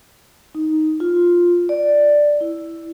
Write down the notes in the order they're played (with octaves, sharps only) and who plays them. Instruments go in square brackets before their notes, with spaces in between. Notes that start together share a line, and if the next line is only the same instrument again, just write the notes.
[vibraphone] D#4
F4
D5
E4